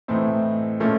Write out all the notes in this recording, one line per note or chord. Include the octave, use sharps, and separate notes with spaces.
A2 E3 A3 C4 D#4
A#2 F3 A3 C#4